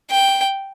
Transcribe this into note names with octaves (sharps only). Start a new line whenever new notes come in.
G5